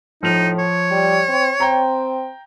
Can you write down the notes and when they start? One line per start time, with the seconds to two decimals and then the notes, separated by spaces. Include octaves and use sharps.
0.23 A2 F3 D#4 F7
0.58 C#5
0.92 G3
1.29 C4
1.60 C4 G5 A#5